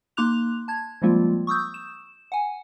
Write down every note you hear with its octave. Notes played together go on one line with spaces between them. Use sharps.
A#3 D#4 C6 D6 F#6 F7
A5 G#6
F3 G3 G#3 A#3 C4 F4
C#6 D#6 E6 G6
E7
F#5 G#5